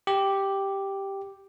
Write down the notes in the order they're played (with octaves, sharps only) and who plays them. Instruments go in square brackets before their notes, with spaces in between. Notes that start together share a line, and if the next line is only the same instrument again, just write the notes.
[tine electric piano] G4